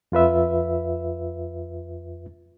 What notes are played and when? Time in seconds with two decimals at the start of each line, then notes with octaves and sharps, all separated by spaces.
0.12 F2 F4 B4 E5